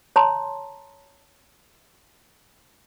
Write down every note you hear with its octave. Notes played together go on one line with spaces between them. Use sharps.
C#5 A5 A#5 C6